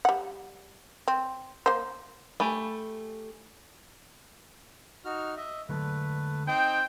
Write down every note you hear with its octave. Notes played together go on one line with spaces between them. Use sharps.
G3 F#5
C4
A#3 C5
A3 G4 G#5 B5
D#4 F#4 F6
D#5 E5
D3 F#3 G#3 A3 B4
C4 D#4 G5